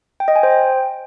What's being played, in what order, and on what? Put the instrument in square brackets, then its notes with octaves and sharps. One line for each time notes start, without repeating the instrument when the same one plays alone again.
[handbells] G5
D#5
G#5
C5
G5